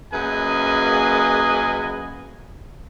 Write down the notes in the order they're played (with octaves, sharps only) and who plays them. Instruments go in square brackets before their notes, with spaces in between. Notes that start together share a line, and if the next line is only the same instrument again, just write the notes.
[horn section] F#2 A#3 G#4 B4 D#5 G#5